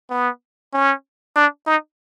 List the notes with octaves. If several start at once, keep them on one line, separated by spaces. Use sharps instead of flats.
B3
C#4
D4
D#4